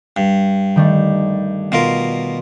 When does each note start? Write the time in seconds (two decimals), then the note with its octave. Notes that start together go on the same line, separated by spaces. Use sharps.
0.17 G2
0.76 D#3 G3 A3
1.72 B2 F4 A#4